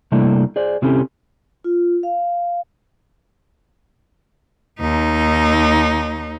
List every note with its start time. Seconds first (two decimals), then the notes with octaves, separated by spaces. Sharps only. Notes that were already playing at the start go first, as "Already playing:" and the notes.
0.12 C3 G3 A3 A#3 D4 E4
0.56 G#4 C5 D5
0.82 C3 C4 C#4 E4 G4 A4
1.64 F4
2.03 F5
4.81 D#2 D#4